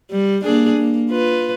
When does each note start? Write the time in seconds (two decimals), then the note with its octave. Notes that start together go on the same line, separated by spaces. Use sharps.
0.11 G3
0.43 A#3 D4 G#4
0.77 A#3
1.10 F4 B4